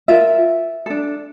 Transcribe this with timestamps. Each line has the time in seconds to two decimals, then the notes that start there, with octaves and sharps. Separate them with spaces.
0.08 F4 A#4 E5
0.86 D4 A4